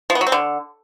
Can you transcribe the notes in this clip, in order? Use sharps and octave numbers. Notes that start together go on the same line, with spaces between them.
F3
B3
F#3
C4
D3